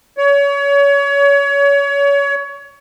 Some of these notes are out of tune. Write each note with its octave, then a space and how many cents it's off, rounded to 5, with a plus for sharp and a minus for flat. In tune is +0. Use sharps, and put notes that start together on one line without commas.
C#5 +30